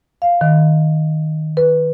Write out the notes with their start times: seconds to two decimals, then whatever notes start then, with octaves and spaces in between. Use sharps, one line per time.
0.22 F5
0.41 D#3
1.57 B4